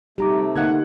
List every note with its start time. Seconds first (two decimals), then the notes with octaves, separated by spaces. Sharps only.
0.18 C3 G3 A3 D#4 G4 A#5 D6
0.56 D3 A#3 D#4 F#5 F#6 G#6